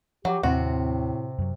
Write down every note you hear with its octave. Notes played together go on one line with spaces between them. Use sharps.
F3 F#3 G4
D#2 A2 C3 C4 F#4
F#2 F#3